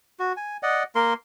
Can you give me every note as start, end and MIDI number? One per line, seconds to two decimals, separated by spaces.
0.19 0.33 66
0.37 0.57 80
0.63 0.83 74
0.63 0.83 75
0.63 0.83 78
0.95 1.14 58
0.95 1.14 70
0.95 1.14 84